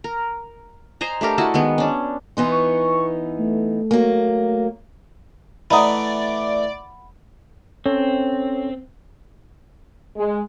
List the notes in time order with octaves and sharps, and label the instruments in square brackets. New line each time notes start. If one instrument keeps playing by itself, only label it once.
[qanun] A#4
C5 D#5 G#5 A#5
A3 D4 G4 A#4
E4 F#4 D#5 A5
D#3 G#3 B3
C#4 D4
[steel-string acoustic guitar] E3 B3 D#4 [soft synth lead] C6
[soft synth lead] C#6
A3
[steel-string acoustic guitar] F#3 A#3
[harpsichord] E3 A3 [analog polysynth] D5 [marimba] D#5 A#5 D#6 [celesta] F#5 B5
[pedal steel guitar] C4 [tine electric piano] C#4 A4 C#5
[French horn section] G#3